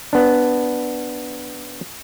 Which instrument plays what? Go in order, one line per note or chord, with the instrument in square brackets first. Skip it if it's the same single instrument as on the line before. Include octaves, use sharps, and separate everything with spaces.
[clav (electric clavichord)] B3 D4